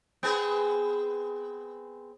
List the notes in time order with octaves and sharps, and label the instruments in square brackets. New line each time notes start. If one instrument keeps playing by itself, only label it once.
[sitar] B3 C4 G#4